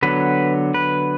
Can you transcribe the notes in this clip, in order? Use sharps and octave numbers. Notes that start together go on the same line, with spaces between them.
D3 F#3 B3 B4
B4